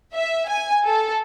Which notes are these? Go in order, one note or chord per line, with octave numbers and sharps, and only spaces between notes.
E5
G#5
A4